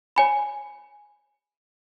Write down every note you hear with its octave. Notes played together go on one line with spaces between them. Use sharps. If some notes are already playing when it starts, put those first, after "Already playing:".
C#5 G#5 B5